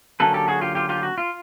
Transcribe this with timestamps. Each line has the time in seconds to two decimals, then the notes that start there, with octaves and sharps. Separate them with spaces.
0.20 D3 F#3 A#3 C#4 A4 B4
0.34 G4 A4
0.48 F#4 G#4
0.61 F4 G4
0.75 F4 G4
0.89 F4 G4
1.03 F#4
1.18 F4